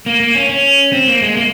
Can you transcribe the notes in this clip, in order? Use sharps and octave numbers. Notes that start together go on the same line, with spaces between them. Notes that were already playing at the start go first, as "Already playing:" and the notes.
A#3
A#3
C#4
C#4
C4
A#3
G#3
A#3